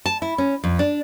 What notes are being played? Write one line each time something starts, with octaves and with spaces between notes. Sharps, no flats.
A5
E4
C#4
F2
D4